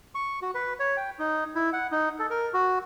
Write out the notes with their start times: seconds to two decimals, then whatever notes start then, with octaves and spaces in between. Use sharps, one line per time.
0.15 C#6
0.42 F#4
0.55 B4
0.80 C#5
0.97 G5
1.19 D#4
1.55 E4
1.73 F#5
1.92 D#4
2.19 A4
2.30 A#4
2.54 F#4